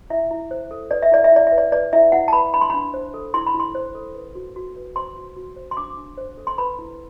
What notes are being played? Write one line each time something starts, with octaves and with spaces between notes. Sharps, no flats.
E4 E5
E4
C5
A4
B4 D5
E5
E4 D5
E5
E4 D5
E5
B4
D5
B4 D5
E4 E5
E4 F#5
A5
B4 B5
D4 B5
C6
D4 B5
C5
A4
E4 C6
B5
E4
C6
C5
A4
B4
F#4
F#4
B4
C5 C6
F#4
F#4
C5
C6
D4 D6
D4
C5
A4
C6
B4 B5
E4